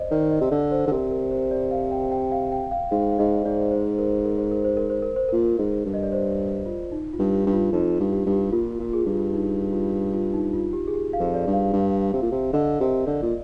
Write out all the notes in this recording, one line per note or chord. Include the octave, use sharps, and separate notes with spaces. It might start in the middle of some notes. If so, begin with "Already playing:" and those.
Already playing: C5 D5 D#5
D#3 D5
D#5
C3
D3 D5
C5
D3
C3 A#4
A#4
C5
D5
F5
G5
G5
F5
G5
F5
G#2 F5
F5
G#2 D#5
C5
G#2 D5
C5
A#4
A#4
C5
A#4
C5
A#4
C5
A#4
C5
A#2 A#4
G#2
G2
D#5
D5
C5
F4
D#4
F4
G2
G4
G2
F4
F2 D#4
G2
G4
G2
G4
A#2 F4
A#2
G#4
G2
F4
D#4
F4
F4
D#4
F4
G4
G#4
G4
F5
F2
D5
G2
F5
G2
C3
A#2
C3
D3 D#5
C3 A#4
D3 D5
A#2